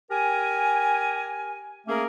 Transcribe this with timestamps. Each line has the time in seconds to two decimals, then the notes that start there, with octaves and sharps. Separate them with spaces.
0.10 G4 A#4 G#5
1.87 A3 A#3 C#4 G#4 A#4